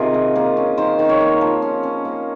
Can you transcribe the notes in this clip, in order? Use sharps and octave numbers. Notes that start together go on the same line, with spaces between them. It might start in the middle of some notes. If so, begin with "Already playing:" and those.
Already playing: C3 D#3 D#4 F4 G#4 A#4
A#3
A#3
C#4
D#3 C5
D#3
C#5
A#3
F3
C#4
C#4
A#3